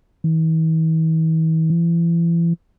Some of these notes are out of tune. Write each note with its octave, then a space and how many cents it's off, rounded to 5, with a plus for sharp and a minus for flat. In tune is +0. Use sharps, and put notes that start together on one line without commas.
E3 -45
E3 +35